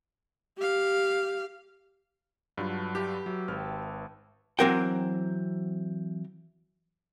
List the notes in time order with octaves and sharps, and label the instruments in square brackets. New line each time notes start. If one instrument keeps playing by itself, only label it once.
[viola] G4 F5
[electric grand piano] G2 F#3 F4 [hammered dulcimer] F#4 A4 B4
[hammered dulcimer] E4 [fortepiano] G4
[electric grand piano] F#3 [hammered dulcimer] E5
[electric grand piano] G#1 F6 [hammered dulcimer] B4 G5 A5
[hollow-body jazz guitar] E3 F#3 C4 A#4 F#5 G5